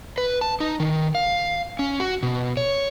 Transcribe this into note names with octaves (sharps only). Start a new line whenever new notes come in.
B4
A5
D#4
D#3
F5
C#4
F#4
B2
C#5